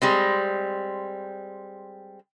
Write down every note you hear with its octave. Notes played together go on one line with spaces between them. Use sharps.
G3 G#3 C4